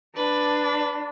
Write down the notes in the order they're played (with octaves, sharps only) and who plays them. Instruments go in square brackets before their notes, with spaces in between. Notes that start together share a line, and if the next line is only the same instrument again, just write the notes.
[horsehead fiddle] D4 [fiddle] B4